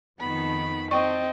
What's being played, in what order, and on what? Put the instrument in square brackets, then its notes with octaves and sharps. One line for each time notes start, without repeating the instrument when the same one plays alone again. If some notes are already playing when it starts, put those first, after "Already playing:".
[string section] F2 D#3 A5 [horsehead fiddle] B3 [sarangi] B5
[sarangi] C4 [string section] A4 [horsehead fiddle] D#5 [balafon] G5 C#6